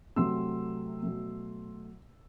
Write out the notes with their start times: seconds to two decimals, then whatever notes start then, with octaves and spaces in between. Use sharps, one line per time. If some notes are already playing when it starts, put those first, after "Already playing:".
0.16 C3 F#3 A3 C6 E6
1.03 B2 F#3 A3